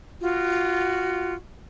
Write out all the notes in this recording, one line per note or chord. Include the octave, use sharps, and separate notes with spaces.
F4 F#4